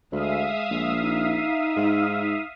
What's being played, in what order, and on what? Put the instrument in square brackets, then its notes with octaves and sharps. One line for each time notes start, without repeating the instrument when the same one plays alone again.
[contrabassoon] D2 [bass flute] G#3 [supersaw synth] E5 F5 D#6
[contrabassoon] A#1
[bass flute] D#4
[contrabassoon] G#2